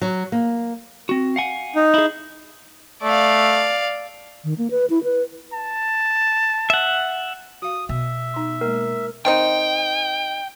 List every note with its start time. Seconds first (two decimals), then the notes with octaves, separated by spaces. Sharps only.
0.01 F#3
0.32 A#3
1.09 C4 F#4
1.36 F5 F#5 G#5
1.76 D#4
1.94 E4 G#4
3.03 A3 D5 F5
4.44 D#3
4.58 A#3
4.71 B4
4.90 E4
5.04 B4
5.53 A5
6.70 E5 F#5
7.62 F#4 F5 D#6
7.89 B2 E5
8.34 D#4 C6
8.61 G#3 A#3 A#4
9.25 D#3 C4 D#4 G5